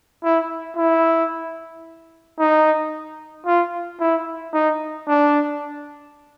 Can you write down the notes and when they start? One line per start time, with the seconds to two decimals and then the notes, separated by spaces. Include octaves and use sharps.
0.24 E4
0.77 E4
2.39 D#4
3.46 F4
4.00 E4
4.53 D#4
5.08 D4